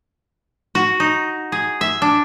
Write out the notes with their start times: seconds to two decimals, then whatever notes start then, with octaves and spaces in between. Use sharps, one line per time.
0.75 F#4
1.00 D#4
1.52 G#4
1.81 E5
2.02 D4